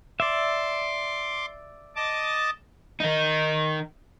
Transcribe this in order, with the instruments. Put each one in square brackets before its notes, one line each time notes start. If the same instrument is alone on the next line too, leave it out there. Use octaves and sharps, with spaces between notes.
[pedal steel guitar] D5 E5 [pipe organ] C6 D6
[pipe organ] D#5 A5 D6
[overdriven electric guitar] D#3 D#4